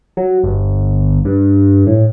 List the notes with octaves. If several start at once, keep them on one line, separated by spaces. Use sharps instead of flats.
F#3
G1
G2
A2